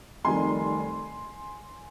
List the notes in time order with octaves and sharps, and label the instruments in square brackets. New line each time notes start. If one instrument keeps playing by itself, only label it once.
[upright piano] F1 F2 D#3 G3 G#5 C6